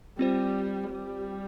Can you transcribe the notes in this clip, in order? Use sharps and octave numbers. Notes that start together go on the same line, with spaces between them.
G3 C4 F4 C5
G3